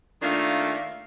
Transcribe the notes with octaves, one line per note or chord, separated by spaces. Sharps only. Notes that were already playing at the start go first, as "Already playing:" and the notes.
D#3 A3 A#3 D4 F4